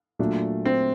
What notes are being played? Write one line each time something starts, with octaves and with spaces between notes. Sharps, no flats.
A#2 F#3 A3 D4 F4
C4